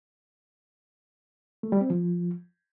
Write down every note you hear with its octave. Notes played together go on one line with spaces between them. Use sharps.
A3
G3
C4
F3